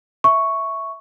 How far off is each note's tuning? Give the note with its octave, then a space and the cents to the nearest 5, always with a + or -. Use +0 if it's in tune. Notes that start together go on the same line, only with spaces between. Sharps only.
E5 -5 C#6 +0